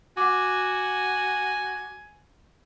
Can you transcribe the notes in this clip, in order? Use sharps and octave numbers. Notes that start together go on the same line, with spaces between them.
F#4 F#5 G#5 D6